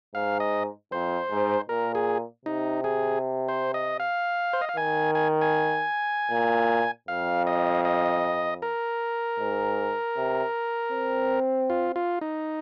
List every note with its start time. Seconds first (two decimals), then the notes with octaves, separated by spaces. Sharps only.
0.15 G#2 F5
0.40 D#5
0.91 F2 C5
1.30 G#2
1.69 A#2 A#4
1.95 G#4
2.46 C3 D#4
2.84 G#4
3.48 C5
3.74 D#5
4.00 F5
4.53 C5
4.61 D#5
4.69 F5
4.77 D#3 G#5
5.15 G#5
5.42 G#5
6.31 A#2
7.08 F2 F5
7.47 D#5
7.85 D#5
8.62 A#4
9.40 G#2
10.16 C3
10.92 C4
11.70 F4
11.96 F4
12.21 D#4